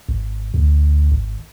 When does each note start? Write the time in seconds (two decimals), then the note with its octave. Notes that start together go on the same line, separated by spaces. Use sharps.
0.09 G#1
0.54 D2
1.12 G#1